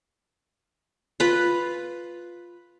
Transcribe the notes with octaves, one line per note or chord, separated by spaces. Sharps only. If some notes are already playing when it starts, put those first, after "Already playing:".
F4 B4